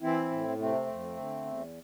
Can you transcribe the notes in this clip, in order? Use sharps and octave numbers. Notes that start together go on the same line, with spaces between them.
E3 C4 E4
A2
C3 A3 C4
F2
D3
E2